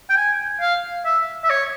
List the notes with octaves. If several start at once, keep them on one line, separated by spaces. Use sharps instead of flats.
G5
G#5
F5
E5
E5
C#5